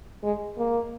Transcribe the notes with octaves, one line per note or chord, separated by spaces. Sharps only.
G#3
A#3